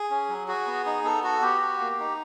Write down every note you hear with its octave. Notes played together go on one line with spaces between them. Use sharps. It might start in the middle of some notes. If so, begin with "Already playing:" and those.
Already playing: G#4
C#4
F#3
F#4 G#4
B3
D#4
B3 A4
F#4 A4
B3 G4
F#4
A#3
D#4